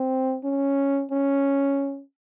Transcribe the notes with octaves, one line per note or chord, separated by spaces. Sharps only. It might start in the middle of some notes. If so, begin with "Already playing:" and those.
Already playing: C4
C#4
C#4